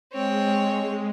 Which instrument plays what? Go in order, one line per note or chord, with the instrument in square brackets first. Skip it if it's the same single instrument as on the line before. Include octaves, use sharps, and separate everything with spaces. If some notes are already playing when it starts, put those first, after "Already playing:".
[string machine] G#3 [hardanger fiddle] C4 C#5